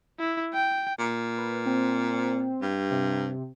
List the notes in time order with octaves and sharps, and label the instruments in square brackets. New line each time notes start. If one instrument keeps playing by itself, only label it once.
[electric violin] E4
G5
[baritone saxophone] A#2
[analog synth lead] B4
C4
[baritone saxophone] G2
[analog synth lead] C3